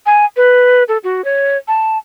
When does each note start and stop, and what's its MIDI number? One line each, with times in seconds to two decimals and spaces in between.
0.06 0.25 80
0.36 0.83 71
0.88 0.98 69
1.04 1.24 66
1.24 1.57 73
1.68 1.98 81